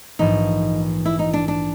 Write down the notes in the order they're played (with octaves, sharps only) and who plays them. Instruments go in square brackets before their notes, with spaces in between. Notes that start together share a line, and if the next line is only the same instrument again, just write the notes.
[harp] A#1 G#2 E3 [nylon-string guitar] D#4
[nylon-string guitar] E4
D#4
D4
D4